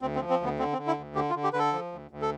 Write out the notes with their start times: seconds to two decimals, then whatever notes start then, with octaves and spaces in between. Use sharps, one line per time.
0.01 D2 C4
0.16 C4
0.21 F3
0.30 C4
0.40 D2 B3
0.59 D3 C4
0.73 C4
0.78 D3
0.87 E4
0.97 D2
1.15 D3 G4
1.30 F4
1.35 D3
1.44 G4
1.53 D3 B4
1.59 A4
1.73 F3
1.92 D2
2.11 D2
2.22 A4